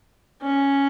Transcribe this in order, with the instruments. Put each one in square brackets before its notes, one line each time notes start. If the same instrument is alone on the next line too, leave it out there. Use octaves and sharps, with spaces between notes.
[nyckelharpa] C#4